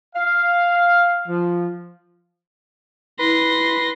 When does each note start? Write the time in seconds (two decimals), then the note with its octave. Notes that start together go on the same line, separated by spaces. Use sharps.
0.16 F5
1.27 F3
3.20 E4 B4 C6 A#6